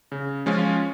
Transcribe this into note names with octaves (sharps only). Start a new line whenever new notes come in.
C#3
F3 G#3 C#4 F4